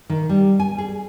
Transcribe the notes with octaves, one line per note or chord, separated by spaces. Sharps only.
D#3
G3
G#5
G#4